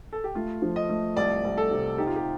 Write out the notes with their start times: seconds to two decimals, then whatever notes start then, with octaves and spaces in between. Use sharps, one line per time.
0.13 A4
0.24 G4
0.35 A3 F4
0.62 F3
0.76 D#5
0.89 A3
1.16 C2 D5
1.44 C2
1.58 A4
1.71 C3
1.98 D#4 G4
2.07 F4
2.16 G4